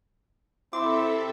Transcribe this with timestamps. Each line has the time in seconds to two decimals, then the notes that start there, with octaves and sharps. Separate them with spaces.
0.73 C3 C4 E4 A4 E5 D6